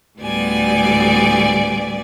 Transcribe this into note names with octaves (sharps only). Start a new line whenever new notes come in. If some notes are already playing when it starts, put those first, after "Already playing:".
D2 A2 G3 B3 D5 G#5